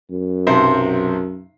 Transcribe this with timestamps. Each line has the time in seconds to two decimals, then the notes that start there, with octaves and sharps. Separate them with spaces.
0.11 F#2
0.47 B1 C3 C5